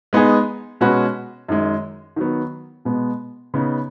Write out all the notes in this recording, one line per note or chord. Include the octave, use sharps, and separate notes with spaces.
G#3 B3 D#4 G#4
B2 G#3 C#4 F#4 B4
F#2 D#3 G#3
D#3 F#3 B3
B2 G#3 B3
C#3 B3 D#4